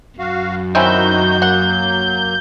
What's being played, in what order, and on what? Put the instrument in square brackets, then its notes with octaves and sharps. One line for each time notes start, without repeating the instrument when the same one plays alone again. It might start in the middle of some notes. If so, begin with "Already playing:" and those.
[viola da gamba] F#2 [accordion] F#4 F5
[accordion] D#3 D#4 F#4 [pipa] C4 C#4 E4 [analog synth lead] G6
[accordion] F#3 A#3 [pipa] F#5